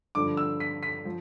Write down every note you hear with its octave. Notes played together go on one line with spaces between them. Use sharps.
G2 D3 F3 D6
E6
B6
B6
F3